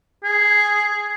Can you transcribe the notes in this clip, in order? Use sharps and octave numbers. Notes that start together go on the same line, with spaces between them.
G#4